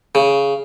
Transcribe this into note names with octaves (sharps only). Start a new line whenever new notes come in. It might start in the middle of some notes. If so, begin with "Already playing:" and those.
C#3